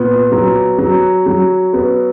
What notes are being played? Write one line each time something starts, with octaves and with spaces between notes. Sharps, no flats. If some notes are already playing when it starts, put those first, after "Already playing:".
Already playing: A#2 B3
F#3
F#3
F#3
B3